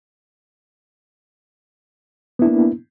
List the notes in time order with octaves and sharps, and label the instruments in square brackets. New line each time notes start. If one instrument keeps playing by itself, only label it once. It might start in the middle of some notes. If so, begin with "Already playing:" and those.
[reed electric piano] B3
E4
D4
A#3